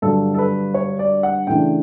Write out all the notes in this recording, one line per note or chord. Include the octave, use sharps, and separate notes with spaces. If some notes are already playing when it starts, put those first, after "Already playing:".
G2 D3 F#3 A4
A4
B4
C#5
D5
F#5
C#3 E3 A3 D4 G5